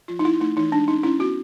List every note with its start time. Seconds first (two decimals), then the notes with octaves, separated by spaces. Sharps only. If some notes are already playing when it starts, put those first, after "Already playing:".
0.08 F3 F4
0.19 D#4
0.25 C4 E4
0.40 A3 D#4
0.57 E3 D#4
0.72 G#3 D4
0.88 C#4 D#4
1.03 C#4 E4
1.19 B3 F#4